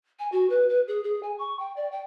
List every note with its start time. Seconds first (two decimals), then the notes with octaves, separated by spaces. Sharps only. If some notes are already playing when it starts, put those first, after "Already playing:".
0.19 G#5
0.32 F#4
0.50 B4
0.69 B4
0.88 G#4
1.04 G#4
1.23 G#5
1.39 C#6
1.59 G5
1.76 D5
1.92 G5